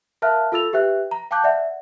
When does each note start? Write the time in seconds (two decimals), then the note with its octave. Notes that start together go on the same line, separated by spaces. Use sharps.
0.22 A#4 E5 F5 A5 F6 F#6
0.52 F4 A4 E6 A6 F7
0.73 G4 B4 E5 G5 F#6
1.11 A#5
1.31 F5 G5 A5 D6 F#6 G6
1.44 D5 E5 F#5